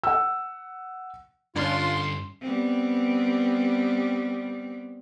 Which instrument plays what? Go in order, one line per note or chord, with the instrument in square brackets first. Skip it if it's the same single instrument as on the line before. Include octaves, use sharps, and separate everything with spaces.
[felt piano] F#5 E6
[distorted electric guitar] G2 D3 [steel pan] C#4 D4 [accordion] F4 [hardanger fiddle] C6
[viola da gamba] G3 B3 C4